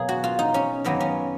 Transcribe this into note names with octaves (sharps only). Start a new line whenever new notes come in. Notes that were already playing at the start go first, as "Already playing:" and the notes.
Already playing: B2 F#3 A#3 G#4
F#4
F4
D#4
C#4
F#2 D#3 F#3 A#3 B3
C#4